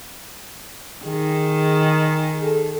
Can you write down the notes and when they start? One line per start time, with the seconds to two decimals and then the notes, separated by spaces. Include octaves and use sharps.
1.05 D#3 G#4
2.45 A4